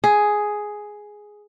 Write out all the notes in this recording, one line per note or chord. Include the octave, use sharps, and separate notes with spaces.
G#4